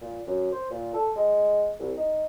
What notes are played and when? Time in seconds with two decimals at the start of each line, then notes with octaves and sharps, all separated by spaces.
0.01 A#2
0.27 F#2
0.52 C5
0.71 A#2
0.94 A4
1.16 G#3
1.79 C2
1.97 D#4